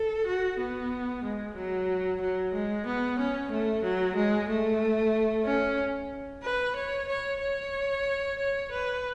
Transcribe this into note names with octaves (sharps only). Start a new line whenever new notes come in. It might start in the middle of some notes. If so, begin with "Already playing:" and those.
Already playing: A4
F#4
B3
G#3
F#3
F#3
G#3
B3
C#4
A3
F#3
G#3
A3
C#4
B4
C#5
C#5
C#5
C#5
B4